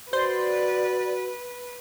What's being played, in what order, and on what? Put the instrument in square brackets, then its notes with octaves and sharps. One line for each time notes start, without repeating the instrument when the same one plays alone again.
[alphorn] F#4 [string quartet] B4 [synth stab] C5 C6 [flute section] D5